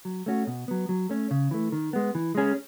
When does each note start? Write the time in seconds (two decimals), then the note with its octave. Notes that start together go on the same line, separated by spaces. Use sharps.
0.05 F#3
0.26 A3 C#4 F#4
0.47 B2
0.68 F#3 B3
0.89 F#3
1.09 A3 C#4
1.31 C#3
1.51 E3 A3
1.72 D#3
1.93 G#3 B3
2.15 E3
2.35 G#3 C#4 G#4